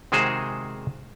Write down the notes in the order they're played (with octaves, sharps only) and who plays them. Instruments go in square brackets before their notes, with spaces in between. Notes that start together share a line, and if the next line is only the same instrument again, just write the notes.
[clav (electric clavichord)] C3 D#3 G#3 F#4 G#4 C5